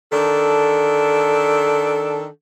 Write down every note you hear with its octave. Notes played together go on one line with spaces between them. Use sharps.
D#3 D4 A4